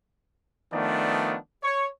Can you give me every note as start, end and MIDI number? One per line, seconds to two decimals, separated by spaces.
0.72 1.36 51
0.72 1.36 53
0.72 1.36 57
0.72 1.36 59
0.72 1.36 62
0.72 1.36 74
1.63 1.88 73